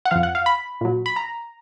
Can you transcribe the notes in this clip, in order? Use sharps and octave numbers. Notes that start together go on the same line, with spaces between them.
F#5
F2 F3 F5
F#5
F5
B5
A#2 F#3
B5
A#5